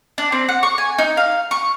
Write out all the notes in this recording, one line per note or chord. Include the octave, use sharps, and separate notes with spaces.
D4
C4
F#5
C#6
G#5
D#4
F5
C#6